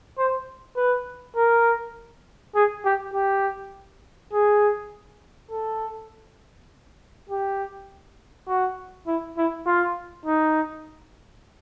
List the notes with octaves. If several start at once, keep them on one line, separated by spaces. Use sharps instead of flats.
C5
B4
A#4
G#4
G4
G4
G#4
A4
G4
F#4
E4
E4
F4
D#4